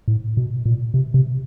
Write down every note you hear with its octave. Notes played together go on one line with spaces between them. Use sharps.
A2
B2
A#2
C3
C3